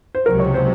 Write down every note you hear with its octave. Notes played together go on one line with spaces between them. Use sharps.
C5
C#2 C3 F#3 A#4
C#5
C5